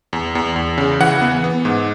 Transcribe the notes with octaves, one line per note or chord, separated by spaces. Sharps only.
E2
E2
E2
C#3
E3 F#5
B3
B3
G#2